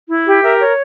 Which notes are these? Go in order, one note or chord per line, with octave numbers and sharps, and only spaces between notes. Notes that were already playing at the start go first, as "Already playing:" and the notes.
E4
G4
A#4 E5
C#5